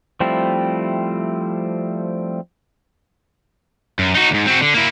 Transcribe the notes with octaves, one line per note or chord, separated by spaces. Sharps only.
F3 G3 A3 C4 E4
F#2
D#4 F#4
D2 G#2
C4 F#4
D3
A#3 E4